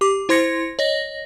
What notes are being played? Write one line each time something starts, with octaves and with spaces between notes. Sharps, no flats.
G4 D6
E4 C5 C6 G#6 A#6 C#7
C#5 D#5 A#6